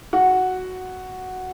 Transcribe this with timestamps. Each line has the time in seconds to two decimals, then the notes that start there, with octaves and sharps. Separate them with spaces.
0.13 F#4